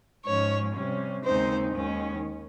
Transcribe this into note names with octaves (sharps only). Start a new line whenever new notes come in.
G#2 F3 G#3 C#4 C#5
C3 G3 C#4
D#2 C#3 G#3 C4 D#4 C5
D#2 D#3 G#3 C#4